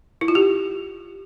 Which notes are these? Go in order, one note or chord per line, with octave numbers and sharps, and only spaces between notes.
E4
F4
G4